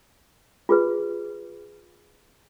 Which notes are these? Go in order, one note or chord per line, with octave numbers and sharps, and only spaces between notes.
F4 G#4 B4